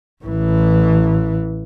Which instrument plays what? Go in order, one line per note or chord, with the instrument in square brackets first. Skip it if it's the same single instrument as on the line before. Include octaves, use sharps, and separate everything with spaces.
[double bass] A1 E3